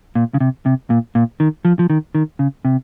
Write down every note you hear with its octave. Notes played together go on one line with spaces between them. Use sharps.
A#2
C#3
C3
C3
A#2
A#2
D#3
F3
F3
D#3
D#3
C#3
C3